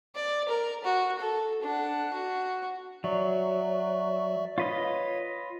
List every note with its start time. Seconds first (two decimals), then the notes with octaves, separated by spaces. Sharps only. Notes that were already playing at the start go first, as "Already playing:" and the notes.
0.16 D5
0.49 A#4
0.84 F#4
1.20 A4
1.62 D4 F#5
2.14 F#4
3.04 F#3 D5 E5
4.58 F4 B4 C#5 D#5